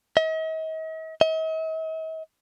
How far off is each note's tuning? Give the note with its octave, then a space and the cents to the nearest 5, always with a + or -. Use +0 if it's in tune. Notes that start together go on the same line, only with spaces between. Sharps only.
D#5 +45
D#5 +45